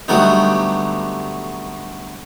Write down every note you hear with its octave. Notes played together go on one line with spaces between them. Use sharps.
D3 F#3 G3 A3 B3 D#4